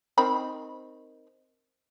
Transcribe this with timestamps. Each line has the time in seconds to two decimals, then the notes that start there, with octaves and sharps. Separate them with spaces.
0.18 D#3 C4 B5